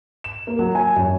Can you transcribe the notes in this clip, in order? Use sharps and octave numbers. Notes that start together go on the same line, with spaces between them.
E7
A#3
F#3
G#5
F#2